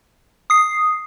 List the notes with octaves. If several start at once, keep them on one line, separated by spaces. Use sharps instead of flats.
D#6 C7